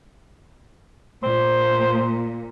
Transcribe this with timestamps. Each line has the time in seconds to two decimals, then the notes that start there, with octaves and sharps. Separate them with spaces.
1.23 A#2 C5